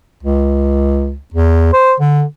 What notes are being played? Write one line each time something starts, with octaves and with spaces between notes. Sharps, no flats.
C#2
E2
C5
D3